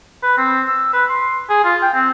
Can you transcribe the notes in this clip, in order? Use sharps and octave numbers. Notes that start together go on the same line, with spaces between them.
B4
C4
E6
B4
C6
G#4
F4
G5
C4